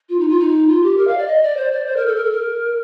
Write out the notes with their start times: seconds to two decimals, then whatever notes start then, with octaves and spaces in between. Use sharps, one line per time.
0.09 F4
0.19 D#4
0.28 F4
0.39 D#4
0.68 F4
0.82 G4
0.97 A#4
1.07 F5
1.17 D5
1.27 D#5
1.41 D5
1.56 C5
1.71 D5
1.86 C5
1.96 A#4
2.06 A4
2.15 A#4
2.24 A4
2.31 A#4